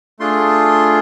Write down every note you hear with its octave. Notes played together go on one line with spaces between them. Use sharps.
A3 D4 F4 G#4 C6